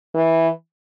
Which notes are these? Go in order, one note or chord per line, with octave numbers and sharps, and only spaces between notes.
E3